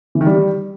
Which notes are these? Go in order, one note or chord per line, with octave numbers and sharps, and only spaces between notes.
E3
D#3
G3